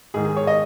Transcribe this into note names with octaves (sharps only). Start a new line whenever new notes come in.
G#2 D#3 G#4
G#4
C#5
D#5